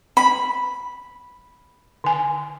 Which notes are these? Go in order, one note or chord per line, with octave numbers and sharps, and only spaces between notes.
B5
D3 G#5